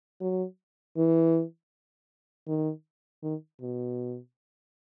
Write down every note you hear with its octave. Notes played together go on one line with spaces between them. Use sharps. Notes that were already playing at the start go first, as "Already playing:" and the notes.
F#3
E3
D#3
D#3
B2